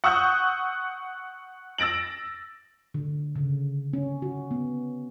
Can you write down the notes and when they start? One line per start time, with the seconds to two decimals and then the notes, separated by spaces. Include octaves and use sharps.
0.04 F#5 C#6 D#6 E6 F#6 G6
1.78 E6 A6 A#6 D7 F#7
2.94 D3
3.36 C#3
3.93 C#4
4.22 F#4
4.51 B3